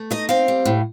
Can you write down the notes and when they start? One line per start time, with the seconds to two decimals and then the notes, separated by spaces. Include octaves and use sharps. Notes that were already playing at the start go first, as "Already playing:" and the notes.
Already playing: A3
0.11 D#4 D#5
0.29 C4 F5
0.48 G3
0.65 A2